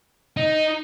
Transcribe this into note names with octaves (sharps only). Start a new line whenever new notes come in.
D#4